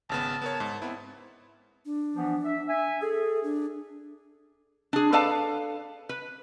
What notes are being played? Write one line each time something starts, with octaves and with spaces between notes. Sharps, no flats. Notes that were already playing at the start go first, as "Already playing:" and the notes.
G#1 C#3 B3 A5
B3 A#4 C#5
G#2
B3 C4 E4
D4
E3 F3 B3
E5
E5 G#5
G#4 A4
D4
D4 G#4
A4 B4 D5 F5 A5
B4